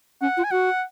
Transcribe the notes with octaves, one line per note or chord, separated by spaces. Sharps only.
C#4 F#5
F4
G#5
F#4 F#5